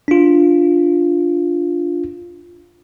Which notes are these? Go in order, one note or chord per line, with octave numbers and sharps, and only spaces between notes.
D4 F4